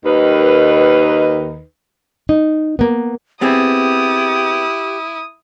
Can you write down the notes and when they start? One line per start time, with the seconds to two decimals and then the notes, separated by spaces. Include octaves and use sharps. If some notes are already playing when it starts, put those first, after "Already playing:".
0.05 D#2 D#3 D#4 B4
2.29 D#4
2.79 A#3 B3
3.41 B3 C4 E4 G4 G#4 D#6